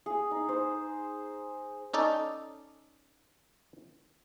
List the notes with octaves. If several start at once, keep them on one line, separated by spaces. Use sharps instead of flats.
G#4
D#4
C5
C#4 D#4 A4 D5